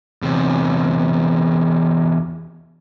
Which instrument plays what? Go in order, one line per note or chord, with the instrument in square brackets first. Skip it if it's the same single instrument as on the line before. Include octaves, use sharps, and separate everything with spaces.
[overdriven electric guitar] E2 C3